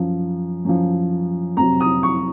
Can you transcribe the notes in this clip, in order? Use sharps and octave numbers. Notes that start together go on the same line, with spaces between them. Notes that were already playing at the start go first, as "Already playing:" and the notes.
Already playing: F#2 F3
F#2 F3
F2 C3 F#3 A#5
D#6
C#6